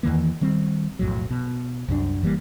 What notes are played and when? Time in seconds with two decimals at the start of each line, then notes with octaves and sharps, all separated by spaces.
0.03 E2 D#3 E3 A#3
0.41 D#3 G3 C4
0.99 B1 F2 A2 F#3
1.30 B2
1.88 C2 F#2 E3 D4
2.22 F1 E3 G3 A#3